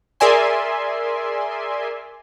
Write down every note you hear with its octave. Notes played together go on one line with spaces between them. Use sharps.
G#4 A#4 D5 E5 G#5 C6